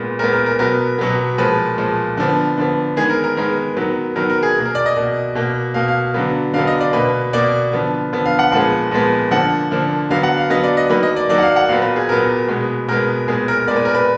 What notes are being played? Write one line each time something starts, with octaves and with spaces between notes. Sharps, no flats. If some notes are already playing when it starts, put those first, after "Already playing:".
Already playing: A#2 G#3 B3
A#2 G#3 B3 A#4
A#4
A#4
B2 F#3 B3 A#4
B2 F#3 B3
A#2 F3 G#3 B4
A#2 F3 G#3
D3 F3 B3
D3 F3 B3
D#3 G#3 B3 G#4
A#4
A#4
D#3 G#3 B3 A#4
D#3 F#3 B3
D#3 F#3 B3 A#4
A#4
G#4
B2 A#3
A#4
D5
D#5
B2 A#3
B2 A#3
B2 A#3 F5
F5
D3 F#3 B3
D3 F#3 B3 F5
D#5
D5
B2 A#3 B4
B2 A#3 D5
D3 F3 B3
D3 F3 B3
F5
F#5
A#2 F3 G#3 B3 F#5
A#2 F3 G#3 B3
D3 F3 A#3 F#5
D3 F3 A#3
D3 F#3 B3 F5
F#5
F5
D3 F#3 B3 D#5
D5
D#5
D#3 F#3 A#3 B4
D#5
D5
D#3 F#3 A#3 D5
F#5
F5
F#5
A#2 F#3 B3 F5
B4
G#4
A#2 F#3 B3 A#4
B2 G#3 B3
B2 G#3 B3 A#4
A#2 G#3 B3 G#4
A#4
A#2 G#3 B3 D5
B4
A#4
B4